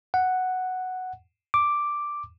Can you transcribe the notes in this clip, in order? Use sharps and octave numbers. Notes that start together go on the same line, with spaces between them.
F#5
D6